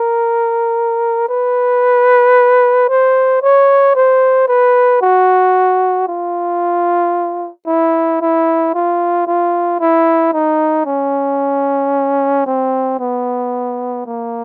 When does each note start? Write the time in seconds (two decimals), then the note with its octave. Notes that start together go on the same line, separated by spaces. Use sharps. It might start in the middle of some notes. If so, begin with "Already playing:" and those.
Already playing: A#4
1.29 B4
2.89 C5
3.42 C#5
3.96 C5
4.48 B4
5.02 F#4
6.07 F4
7.67 E4
8.21 E4
8.74 F4
9.27 F4
9.80 E4
10.33 D#4
10.86 C#4
12.46 C4
13.00 B3
14.06 A#3